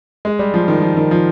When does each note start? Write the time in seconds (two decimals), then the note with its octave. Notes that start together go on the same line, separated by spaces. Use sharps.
0.25 G#3
0.39 G3
0.54 F3
0.68 D#3
0.82 F3
0.97 D#3
1.11 F3